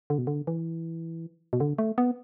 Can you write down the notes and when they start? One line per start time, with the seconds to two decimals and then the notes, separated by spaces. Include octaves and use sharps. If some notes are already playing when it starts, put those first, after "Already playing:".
0.10 D3
0.18 B2
0.27 D3
0.47 E3
1.53 B2
1.60 D3
1.78 A3
1.98 B3